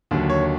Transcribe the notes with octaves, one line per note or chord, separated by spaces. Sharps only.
D#2 D3 F#3
C#5